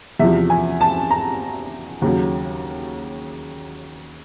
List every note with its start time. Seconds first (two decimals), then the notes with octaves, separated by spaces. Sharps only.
0.19 E2 C3 F3 E5
0.50 G#5
0.81 A5
1.11 A#5
2.02 D#2 C#3 F#3